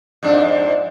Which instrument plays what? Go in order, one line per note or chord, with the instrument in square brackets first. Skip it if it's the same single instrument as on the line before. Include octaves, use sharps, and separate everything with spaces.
[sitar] F2 G#2 D4